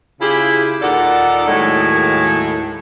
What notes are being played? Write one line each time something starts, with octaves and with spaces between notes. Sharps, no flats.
C#3 E4 F4 G4 G#4
D#2 A#2 D#4 A4 D5 F#5
D#2 A2 D#3 F#3 G#3